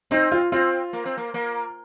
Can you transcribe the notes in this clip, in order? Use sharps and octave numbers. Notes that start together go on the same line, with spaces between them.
C4 D#4
F4
C4 F4
A#3
C4
A#3
A#3